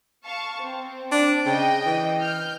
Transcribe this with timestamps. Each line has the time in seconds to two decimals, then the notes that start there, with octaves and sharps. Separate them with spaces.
0.25 F5 A5 C#6
0.62 C4
1.11 D4
1.46 C#3 D#5 G5
1.85 E3
2.21 F6 G6